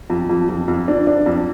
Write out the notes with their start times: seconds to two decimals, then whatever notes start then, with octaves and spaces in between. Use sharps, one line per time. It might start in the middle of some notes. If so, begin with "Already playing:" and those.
0.10 F2
0.29 F2
0.49 F2
0.68 F2
0.88 D4
1.07 D4
1.26 F2